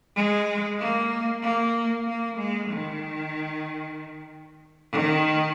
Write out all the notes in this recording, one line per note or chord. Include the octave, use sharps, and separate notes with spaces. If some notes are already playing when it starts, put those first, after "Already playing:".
G#3
A#3
A#3
A#3
G#3
D#3
D#3